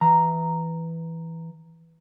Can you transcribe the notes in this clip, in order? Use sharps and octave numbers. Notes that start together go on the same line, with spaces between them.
E3 A#5